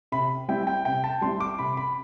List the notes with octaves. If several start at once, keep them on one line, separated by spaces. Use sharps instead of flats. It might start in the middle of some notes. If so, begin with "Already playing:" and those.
C3 B5
G3 C4 E4 G5
G5
C3 G5
A5
G3 C4 E4 C6
D6
C3 B5
B5